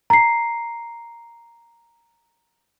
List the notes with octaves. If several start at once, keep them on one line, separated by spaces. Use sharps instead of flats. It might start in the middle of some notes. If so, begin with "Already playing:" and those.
A#5 C7